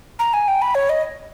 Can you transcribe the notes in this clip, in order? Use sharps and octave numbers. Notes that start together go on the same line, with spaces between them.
A#5
G#5
G5
B5
C#5
D#5